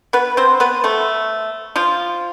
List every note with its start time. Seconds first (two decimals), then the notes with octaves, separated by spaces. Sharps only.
0.13 B3 B4
0.37 C4 C5
0.60 B3 B4
0.84 A3 A4
1.76 F3 F4